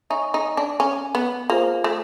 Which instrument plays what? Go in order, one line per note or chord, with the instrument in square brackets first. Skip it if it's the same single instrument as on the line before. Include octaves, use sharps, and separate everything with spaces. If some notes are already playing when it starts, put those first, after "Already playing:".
[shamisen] D#4 [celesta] C#5 E5 G#5 C#6
[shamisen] D#4
D4
C#4
B3
[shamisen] A#3 [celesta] F4 G#4 C5
[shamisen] A3